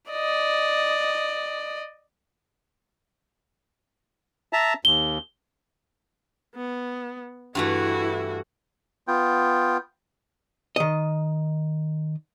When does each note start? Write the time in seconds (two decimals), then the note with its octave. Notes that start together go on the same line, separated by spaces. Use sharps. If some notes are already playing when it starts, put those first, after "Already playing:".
0.11 D5 D#5
4.53 E5 A5 A#5
4.85 D#2 G7
6.56 B3
7.55 G2 E3 A3 E4 F#4
9.08 B3 F4 G5
10.76 D#3 D#5